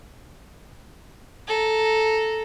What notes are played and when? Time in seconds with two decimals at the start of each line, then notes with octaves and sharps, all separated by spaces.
1.48 A4 A#5